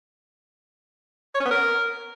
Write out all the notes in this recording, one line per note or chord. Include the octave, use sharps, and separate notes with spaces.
C#5
C#4
B3
A#4